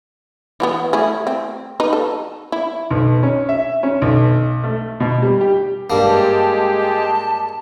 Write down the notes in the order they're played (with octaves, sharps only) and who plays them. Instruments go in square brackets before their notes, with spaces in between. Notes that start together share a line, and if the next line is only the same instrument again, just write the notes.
[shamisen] E3 F#3 B3
A3 E4 G#4
C4
D#4 B4
A4
E4
[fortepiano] B1
C#4
E5
C#4
B1
A3
B2
G3
G4
[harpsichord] G2 A#3 [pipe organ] G#3 G4 [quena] A5
[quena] A5